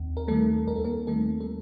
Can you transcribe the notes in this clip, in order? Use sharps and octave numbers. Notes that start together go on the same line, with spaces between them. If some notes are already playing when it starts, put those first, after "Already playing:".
Already playing: D#2 D#3 C4
A#4
D#3 G3 A3 A4
D#2 A#4
A4
A#3 A#4
D#3 G3 A3 A4
A4